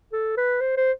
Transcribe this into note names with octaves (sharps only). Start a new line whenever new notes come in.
A4
B4
C5
C5